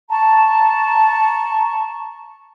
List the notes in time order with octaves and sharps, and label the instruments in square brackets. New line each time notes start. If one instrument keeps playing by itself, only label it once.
[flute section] A5 A#5 C#6